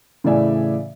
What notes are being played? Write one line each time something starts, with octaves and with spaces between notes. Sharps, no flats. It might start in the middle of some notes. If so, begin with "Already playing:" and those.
A2 C#3 E3 D5 E5 G#5